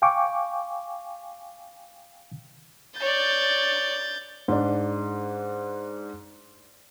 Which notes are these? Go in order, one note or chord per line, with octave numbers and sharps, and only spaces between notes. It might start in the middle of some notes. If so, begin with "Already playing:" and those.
F5 G5 G#5 C#6 D6
C#5 D5 G6 A6
G#2 D4